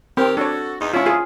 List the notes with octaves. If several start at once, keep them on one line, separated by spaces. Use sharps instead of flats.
D#3 C4 G4 A#4
D4 F#4 A4 C#5
E2 D#4
D2 C#4 E4 F4 C#5
F4 G#4